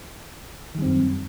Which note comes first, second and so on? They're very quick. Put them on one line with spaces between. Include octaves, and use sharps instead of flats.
D#3 G3 C4 F#2